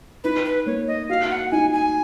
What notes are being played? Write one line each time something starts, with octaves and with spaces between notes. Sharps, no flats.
D#4 B4
B4
A#3 C#5
D#5
F#4 F5
F#5
D#4 G#5
G#5